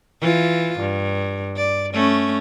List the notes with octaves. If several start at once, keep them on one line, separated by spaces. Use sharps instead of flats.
E3 F4
G2
D5
A3 C#4